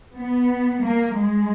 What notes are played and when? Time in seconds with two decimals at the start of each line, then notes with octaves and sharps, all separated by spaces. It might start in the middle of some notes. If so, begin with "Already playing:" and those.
0.18 B3
0.83 A#3
1.15 G#3